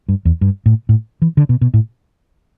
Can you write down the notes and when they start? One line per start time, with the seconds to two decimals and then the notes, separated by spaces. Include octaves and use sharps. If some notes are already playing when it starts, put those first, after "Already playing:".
0.09 G2
0.25 E2
0.41 G2
0.66 A2
0.89 A2
1.22 E3
1.37 D3
1.49 B2
1.61 B2
1.74 A2